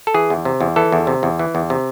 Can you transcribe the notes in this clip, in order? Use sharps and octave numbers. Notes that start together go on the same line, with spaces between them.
A4
E3 G#4
E2
C3
E2
E3 A4
E2
C3
E2
E3
E2
C3